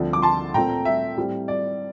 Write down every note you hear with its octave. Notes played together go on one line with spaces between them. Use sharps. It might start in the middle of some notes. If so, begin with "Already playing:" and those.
Already playing: D2 D3 F3 C4
D6
A5 C6
A#2 A3 C4 G5 A#5
E5
A2 G3 C4
D5